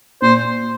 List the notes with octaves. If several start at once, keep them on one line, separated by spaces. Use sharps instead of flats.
A#2 C5